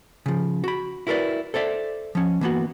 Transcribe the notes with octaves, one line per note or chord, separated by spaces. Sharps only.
C#3 F3
F#4 B5
E4 F#4 A#4 B4 D5
A4 C5 D5 E5
F3 C#4
E3 A#3 B3 F#4